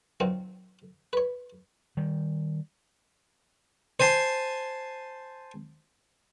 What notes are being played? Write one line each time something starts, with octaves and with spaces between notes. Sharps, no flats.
A#2 D#3 F#3 C4
B4 C#5
D#3 G3
C5 G#5 A5 C6